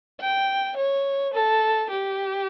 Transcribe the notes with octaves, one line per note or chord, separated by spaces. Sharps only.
G5
C#5
A4
G4